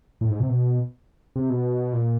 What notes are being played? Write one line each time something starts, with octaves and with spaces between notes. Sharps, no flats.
A2
G#2
C3
B2
C3
B2
A#2